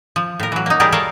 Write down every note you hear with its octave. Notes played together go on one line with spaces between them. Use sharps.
F3
A2 A#4
E3 F#3
A#3 D#4
G3 G4 G#4 A#4 D5
A4 A#4 C#5 D5 F5